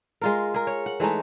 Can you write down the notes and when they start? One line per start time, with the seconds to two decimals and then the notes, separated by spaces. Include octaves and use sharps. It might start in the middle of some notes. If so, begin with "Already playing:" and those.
0.21 G#3 F4 A#4
0.54 G#4 A#4
0.67 C#5
0.86 F#5
1.00 E3 G#3 A3 D#4